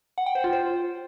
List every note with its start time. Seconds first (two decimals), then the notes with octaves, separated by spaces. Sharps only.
0.18 F#5
0.26 G5
0.35 C5
0.44 F4
0.53 C5